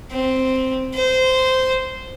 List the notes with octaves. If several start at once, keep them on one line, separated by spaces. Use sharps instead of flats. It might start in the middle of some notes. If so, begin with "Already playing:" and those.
C4
C5